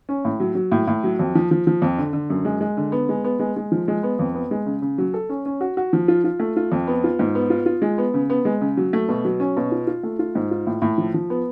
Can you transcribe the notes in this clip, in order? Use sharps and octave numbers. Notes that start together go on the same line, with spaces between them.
C#4
A2
F#3
F#3
A2
A2
F#3
F2
F3
F3
F3
F2
D3
D3
F#2
G#3
G#3
D3
B3
G#3
B3
G#3
G#3
F3
G#3
B3
F2
B3
G#3
C#3
C#3
F#3
A4
C#4
C#4
F#4
F#4
F3
F4
F4
A3
F4
F2
B3
F4
G#2
B3
F4
F4
G#3
B3
C#3
B3
G#3
C#3
F#3
A3
B2
F#3
C#4
B2
F4
F4
A3
F4
G#2
F4
A2
A2
F3
F3
B3